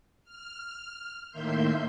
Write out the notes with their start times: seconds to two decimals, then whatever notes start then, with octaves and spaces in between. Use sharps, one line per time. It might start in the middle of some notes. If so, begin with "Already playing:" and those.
0.24 F6
1.31 A2 D#3 A#3 E5 C6 G6